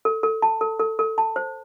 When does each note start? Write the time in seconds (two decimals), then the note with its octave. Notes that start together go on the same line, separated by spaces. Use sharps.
0.05 A4
0.23 A4
0.42 A5
0.61 A4
0.79 A4
0.99 A4
1.18 A5
1.36 C5